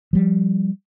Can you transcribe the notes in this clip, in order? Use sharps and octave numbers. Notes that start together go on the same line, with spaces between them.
F3 G3